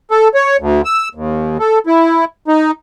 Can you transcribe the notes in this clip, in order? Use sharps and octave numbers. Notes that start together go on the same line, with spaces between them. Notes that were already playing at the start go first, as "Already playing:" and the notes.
A4
C#5
D2
E6
D#2
A4
E4
D#4